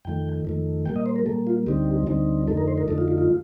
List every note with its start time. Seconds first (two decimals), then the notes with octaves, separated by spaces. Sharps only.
0.05 F2 D#3 A3 G5
0.45 F2 D#3 A3
0.86 A#2 G3 A#3 G5
0.96 D#5
1.06 C5
1.16 A#4
1.26 A#2 G3 A#3 A4
1.47 F4
1.66 D2 D3 G3 C4 D#4 G4
2.07 D2 D3 G3 C4 D#4
2.47 F2 D3 A3 D#4 A4
2.57 A#4
2.68 C5
2.78 A#4
2.88 F2 D3 A3 D#4 A4
2.98 F4
3.08 F4
3.18 F4